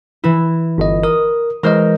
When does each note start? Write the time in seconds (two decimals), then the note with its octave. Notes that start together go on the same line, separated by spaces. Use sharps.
0.24 E3 E4
0.78 G1 D#5
1.03 A#4 D#6
1.63 E3 G#3 A#4 C5 D#5